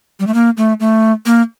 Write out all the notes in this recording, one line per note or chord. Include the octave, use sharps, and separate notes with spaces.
G3
A3
A#3
A3
A3
A#3